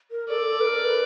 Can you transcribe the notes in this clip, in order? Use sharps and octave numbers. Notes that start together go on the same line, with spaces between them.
A#4
A4 D5
A4
B4
A#4
B4